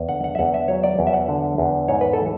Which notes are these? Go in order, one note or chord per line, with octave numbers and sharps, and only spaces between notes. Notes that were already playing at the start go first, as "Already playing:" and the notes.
Already playing: E2
D3 F#5
F#5
E5
E2 F#5
E5
F#3 C#5
D5
E2
E5
F#5
D3
E2
G#2 C#5
B4
E3 A4